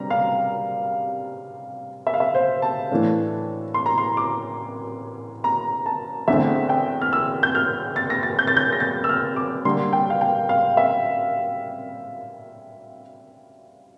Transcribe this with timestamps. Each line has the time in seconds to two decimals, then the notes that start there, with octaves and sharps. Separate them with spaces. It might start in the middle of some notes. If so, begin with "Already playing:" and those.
Already playing: C3 G3 D4 A#5
0.10 F5
2.07 E5
2.14 F5
2.20 E5
2.35 C5
2.62 A5
2.91 A2 E3 A3 D4
3.74 C6
3.86 A#5
3.98 C6
4.17 D6
5.44 A#5
5.86 A5
6.28 E2 D3 A3 C4 E5
6.69 G5
7.02 F6
7.13 E6
7.43 G6
7.55 F6
7.96 A6
8.10 A#6
8.23 A6
8.39 G6
8.47 A6
8.57 G6
8.72 A#6
8.80 A6
9.04 E6
9.09 F6
9.36 D6
9.65 D3 G3 A#3 C6
9.93 G5
10.10 F5
10.21 G5
10.49 F5
10.77 E5